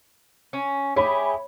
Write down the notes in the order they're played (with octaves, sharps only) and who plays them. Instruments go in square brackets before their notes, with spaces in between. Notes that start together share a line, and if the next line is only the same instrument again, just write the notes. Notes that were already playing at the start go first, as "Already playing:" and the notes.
[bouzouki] C#4
[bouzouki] E4 G4 G#4 [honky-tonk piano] C#5 B5